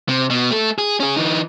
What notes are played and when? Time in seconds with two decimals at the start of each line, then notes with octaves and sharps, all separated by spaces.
0.09 C3
0.30 B2
0.51 A3 A4
0.78 G#4
1.00 C#4 G#4
1.17 E3 D#4